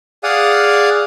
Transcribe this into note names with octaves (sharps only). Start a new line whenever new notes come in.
G#4 D5 F5 F#5 D#6